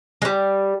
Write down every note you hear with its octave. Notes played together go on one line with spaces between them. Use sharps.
G3 G#3